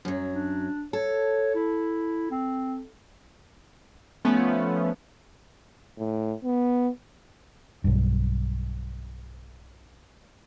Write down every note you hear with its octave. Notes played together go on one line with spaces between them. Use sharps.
F#2 F#3
D4
A4 C#5
E4
C4
F3 A3 B3 C#4
A2
B3
B1 G2